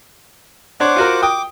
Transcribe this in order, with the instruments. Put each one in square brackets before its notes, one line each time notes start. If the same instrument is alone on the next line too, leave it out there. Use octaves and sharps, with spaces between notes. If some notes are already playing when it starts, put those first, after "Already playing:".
[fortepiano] D4 C#5 [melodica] C5 F#5 D6
[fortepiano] F4 F#4 A#4
[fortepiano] G5 D#6 [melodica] D6